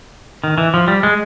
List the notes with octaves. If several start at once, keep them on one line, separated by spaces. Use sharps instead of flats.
D#3
E3
F3
G3
G#3